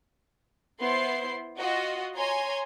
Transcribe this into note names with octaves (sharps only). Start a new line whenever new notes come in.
B3 E4 C5 C6 C7
F4 F#4 D#5
C#5 G#5 A#5 C6